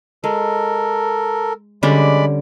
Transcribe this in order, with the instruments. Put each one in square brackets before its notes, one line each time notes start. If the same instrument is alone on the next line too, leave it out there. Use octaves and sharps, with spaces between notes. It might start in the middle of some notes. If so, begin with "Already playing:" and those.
[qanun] G#3 [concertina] A4 A#4
[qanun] D3 G3 C#4 [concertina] G#3 D5 B5